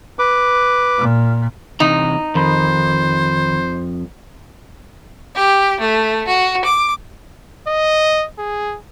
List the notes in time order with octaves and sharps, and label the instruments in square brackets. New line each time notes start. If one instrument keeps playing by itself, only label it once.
[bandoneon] B4 D6
[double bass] A#2
[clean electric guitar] C3 E3 A#5 [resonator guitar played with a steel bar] D#4
[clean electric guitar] F2 [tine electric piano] D#3 B5 [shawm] C5
[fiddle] G4
A3
F#4
D6
[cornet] D#5
G#4